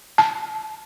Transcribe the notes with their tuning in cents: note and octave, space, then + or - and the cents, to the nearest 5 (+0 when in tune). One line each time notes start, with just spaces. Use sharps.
A5 -25